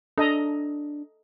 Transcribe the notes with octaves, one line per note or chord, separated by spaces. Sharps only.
D4 A4 D#5 A#5